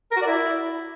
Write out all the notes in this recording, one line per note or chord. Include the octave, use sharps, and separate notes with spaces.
A#4
F#4
D5
E4